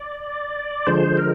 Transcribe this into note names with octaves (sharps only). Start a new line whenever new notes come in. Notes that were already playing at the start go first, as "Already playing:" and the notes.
Already playing: D5
D3 F3 G#3 C5
A#4